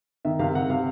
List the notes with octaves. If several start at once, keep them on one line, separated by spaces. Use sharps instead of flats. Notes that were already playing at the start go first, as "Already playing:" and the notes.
D#3 E5
C3 F5
C3 F#5
C3 F5